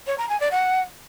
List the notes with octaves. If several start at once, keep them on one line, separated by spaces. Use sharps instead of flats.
C#5
A#5
G#5
D5
F#5